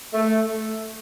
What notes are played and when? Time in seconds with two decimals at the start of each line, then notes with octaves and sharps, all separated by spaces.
0.14 A3